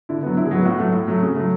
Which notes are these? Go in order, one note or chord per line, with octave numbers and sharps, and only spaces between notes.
D3 E4
F#3 B3
D3 E4
G#4
F#3 B3 F#4
A2 F#4
F#3 A3
A2
F#3 A3
C#3
F#3 A3